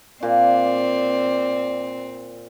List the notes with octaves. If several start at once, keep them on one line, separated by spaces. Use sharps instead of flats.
A#2 C4 D5